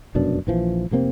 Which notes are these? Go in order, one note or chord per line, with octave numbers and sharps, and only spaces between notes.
F1 F#2 B2 D4
A#1 E3 F3
F1 C3 A#3 C4